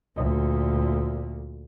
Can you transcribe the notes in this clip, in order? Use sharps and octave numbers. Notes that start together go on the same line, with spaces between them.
D2 A#2